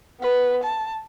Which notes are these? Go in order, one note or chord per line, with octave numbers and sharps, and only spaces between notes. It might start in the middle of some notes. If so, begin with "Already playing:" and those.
B3 B4
A5